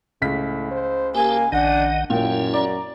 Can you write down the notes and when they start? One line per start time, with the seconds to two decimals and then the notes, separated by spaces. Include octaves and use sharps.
0.22 C#2 A2 B6
0.71 C5
1.15 A#3 G4 G#5 A5
1.52 A#1 D#3 D4 D#5 F#5
2.10 F#2 A#2 C#4 E4 G5
2.53 D5 A#5